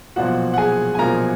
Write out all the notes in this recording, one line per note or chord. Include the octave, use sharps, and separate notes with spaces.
B1 A#2 F3 F#4 F#5
F#5
G#4 G#5
G#5
B1 A#2 F3 A#4 A#5